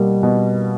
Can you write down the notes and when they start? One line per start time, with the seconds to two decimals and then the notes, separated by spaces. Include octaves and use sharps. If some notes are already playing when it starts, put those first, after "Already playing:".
Already playing: B2 G3 A#3
0.23 B2